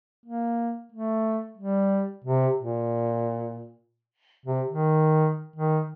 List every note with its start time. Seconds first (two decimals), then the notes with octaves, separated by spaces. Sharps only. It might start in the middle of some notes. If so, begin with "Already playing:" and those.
0.26 A#3
0.92 A3
1.58 G3
2.24 C3
2.58 A#2
4.46 C3
4.68 D#3
5.56 D#3